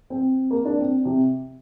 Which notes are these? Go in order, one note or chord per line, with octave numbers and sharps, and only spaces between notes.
C4
A#3
D4
C4
C3